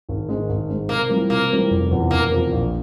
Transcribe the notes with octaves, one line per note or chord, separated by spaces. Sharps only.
G#1
G#2 D#3 G#3
G#1
G#2 D#3 G#3
C3 A#3
E3 G3 C4 F4
C3 A#3
E3 G3 C4 F4
F1
E2 C3 F3
F1 A#3
E2 C3 F3
A#1